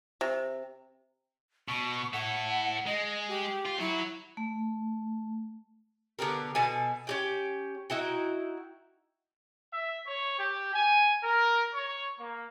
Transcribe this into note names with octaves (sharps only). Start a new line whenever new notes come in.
C3
B2 C#6
E4 A4 F#5
G#3 D#5
G4
F4
F#3 E4 F#4
A3
D3 B3 G4 A#4
B2 A4 G#5
C#4 G4 G5
D#4 E4 F#4 G5
E5
C#5
G4
G#5
A#4
C#5
A#3